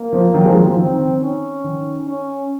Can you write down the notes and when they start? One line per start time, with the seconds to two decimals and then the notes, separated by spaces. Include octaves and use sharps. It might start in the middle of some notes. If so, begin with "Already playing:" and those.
Already playing: A#3
0.13 F3
0.34 D#3 F#3
0.45 F3 G#3
0.56 D#3 F#3
0.67 F3
0.77 D#3 C4
0.99 D#3
1.21 C#4
1.64 D#3
2.08 C#4